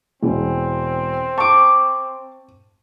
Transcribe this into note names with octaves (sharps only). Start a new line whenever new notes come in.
E1 C4
A5 C#6 D6